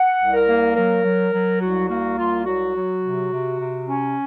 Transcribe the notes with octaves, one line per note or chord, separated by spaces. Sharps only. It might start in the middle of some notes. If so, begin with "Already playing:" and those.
Already playing: F#5
C2
A#4
A#3
F#3 A#4
F#3
F#3
C2 F#4
A#3 F#4
C2 F4
F#3 F#4
F#3
C3
C3
C3
C#4